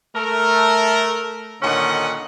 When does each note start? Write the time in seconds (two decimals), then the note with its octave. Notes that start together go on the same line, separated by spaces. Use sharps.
0.16 A3 A#4
1.62 A#2 D3 D#3 C#4 D#5 F#5